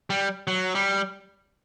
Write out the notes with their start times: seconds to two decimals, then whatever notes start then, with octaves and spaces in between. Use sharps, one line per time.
0.10 G3
0.48 F#3
0.75 G3